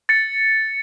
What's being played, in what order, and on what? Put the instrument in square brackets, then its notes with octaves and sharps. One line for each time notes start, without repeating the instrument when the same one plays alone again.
[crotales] A6 C#7